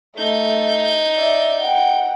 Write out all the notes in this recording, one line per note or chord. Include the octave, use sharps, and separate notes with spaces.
A3 D#4 G6
D5 E5
F#5 G5